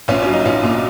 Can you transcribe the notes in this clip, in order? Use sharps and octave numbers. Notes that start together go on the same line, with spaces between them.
A#1 C#4 F4
F#3 C#4
D#4
A#1 C#4 F4
A#2